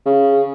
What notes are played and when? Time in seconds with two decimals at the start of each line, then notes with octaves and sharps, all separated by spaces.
0.06 C#3